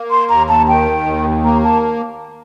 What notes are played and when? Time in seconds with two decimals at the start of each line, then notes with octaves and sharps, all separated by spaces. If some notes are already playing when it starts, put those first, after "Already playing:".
Already playing: A#3
0.11 C6
0.29 D#2 A#5
0.49 A5
0.68 D#3 G5
1.06 D#2
1.44 A#3 A#5
1.64 A5